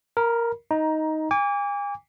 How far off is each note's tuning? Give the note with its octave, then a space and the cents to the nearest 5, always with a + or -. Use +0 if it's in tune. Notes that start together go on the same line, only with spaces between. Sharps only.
A#4 +0 B5 -40
D#4 +10 A#5 +20
G#5 -40 D6 -30